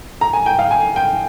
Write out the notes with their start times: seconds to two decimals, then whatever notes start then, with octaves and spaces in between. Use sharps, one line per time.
0.21 A#5
0.33 G#5
0.46 G5
0.59 F5
0.71 G#5
0.96 G5